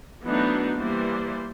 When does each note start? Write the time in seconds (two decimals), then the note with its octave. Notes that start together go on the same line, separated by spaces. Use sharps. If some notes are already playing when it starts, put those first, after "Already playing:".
0.24 E3 F#3 A3 B3 D4 D#4
0.76 E3 G3 A#3 C5 D5